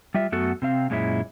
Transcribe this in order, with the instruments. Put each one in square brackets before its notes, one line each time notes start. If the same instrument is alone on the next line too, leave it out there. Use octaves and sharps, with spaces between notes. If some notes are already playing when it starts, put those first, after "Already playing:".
[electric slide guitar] G3 F4 E5
F#2 A3 B3 F#4 A4
C3 C4 F5
F#2 A#2 G#3 C#4 E4